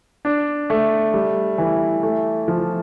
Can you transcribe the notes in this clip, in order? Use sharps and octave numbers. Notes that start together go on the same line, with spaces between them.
D4
A3
G3
E3
A3
F3